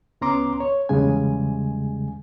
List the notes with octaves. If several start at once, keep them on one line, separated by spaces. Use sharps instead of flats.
C#2 B3 C#4 A#5 C6 D6
C#5
E2 C#3 G3 G#3 G#5